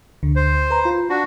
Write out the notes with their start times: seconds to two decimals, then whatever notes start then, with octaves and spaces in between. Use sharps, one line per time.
0.23 D2 D3
0.36 C5
0.71 B4 A#5
0.85 F4
1.10 D4 F#4